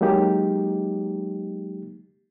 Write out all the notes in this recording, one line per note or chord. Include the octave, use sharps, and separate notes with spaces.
F#3 G#3 A#3 D#4 G4